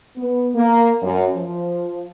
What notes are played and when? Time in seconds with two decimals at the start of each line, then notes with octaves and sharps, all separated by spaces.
0.16 B3
0.55 A#3
1.01 F#2
1.35 F3